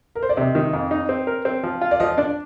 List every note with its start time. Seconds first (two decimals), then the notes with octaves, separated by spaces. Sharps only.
0.15 A#4
0.23 C5
0.29 D5
0.37 C3 D#5
0.55 D#3
0.73 F2
0.91 D#4
1.09 C4
1.27 A#4
1.45 C4
1.64 F3
1.81 F4
1.91 D5
2.00 F3 D#5
2.17 D4 D5